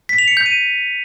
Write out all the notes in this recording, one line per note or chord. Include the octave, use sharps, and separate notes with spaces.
B6
F7
C#7
G6
D#7